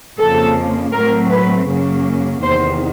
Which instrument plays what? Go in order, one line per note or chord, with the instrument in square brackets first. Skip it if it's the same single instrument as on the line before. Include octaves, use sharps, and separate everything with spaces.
[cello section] F2 C#3 F3 A#3 A4
A2 F#3 A3 C4 A#4
B4
F#2 C#3 F#3 A#3
E2 C3 D#3 C5